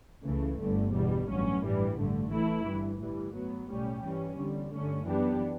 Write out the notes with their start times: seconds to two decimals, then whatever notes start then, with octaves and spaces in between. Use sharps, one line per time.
0.24 C#2 C#3 E3 A3
0.59 G1 G2 D3 A3
0.94 E2 B2 G3
1.29 A1 G2 F#3 C#4
1.62 A1 G2 E3 G3
1.96 A1 G2 D3 A3
2.31 E3 A3 E4
2.65 G1 G2 E3
3.00 A2 E3 G3
3.34 A2 F#3 B3
3.69 B1 A2 G3 C#4 G4
4.04 G2 E3 G3 C#4
4.37 E2 D3 G3
4.72 G2 D3 A3 C#4
5.06 F#2 E3 B3 D4 G4